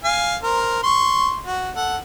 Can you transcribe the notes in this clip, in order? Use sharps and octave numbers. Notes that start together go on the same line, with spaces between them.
F5 G#5
A#4 C5
C6 C#6
F#4
A4 F#5